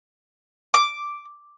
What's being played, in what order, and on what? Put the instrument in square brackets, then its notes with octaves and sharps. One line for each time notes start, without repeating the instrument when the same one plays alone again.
[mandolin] D6